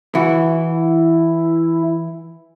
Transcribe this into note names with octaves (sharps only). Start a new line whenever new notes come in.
E3 E4 F#4